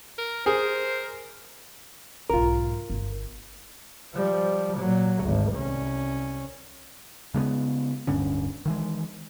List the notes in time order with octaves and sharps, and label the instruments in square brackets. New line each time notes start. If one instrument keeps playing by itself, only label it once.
[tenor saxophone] A#4
[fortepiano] G#4 [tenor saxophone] A#4 [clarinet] C5
[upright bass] B1 G#2 [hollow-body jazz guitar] F4 A#4
[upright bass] G1
[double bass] F3 G3
A#2 F#3
G#1 D2
C2 C#4
[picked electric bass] C#3 G#3 A3 B3
D1 G2 D3 C#4
D#3 E3 G#3